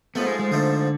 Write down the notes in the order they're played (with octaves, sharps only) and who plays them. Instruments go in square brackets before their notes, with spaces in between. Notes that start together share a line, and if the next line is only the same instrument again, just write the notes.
[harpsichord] G#2 F3 A3 [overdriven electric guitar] B3
[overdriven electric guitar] G#3
G#3
[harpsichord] G#2 F3 A3 [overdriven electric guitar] D3